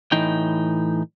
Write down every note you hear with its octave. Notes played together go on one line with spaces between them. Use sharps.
A2 E3 D#4 G5